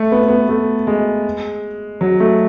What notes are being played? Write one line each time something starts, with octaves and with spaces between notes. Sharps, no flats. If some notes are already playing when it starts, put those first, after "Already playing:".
Already playing: A3
B3
B3
A3
G#3
F#3
A3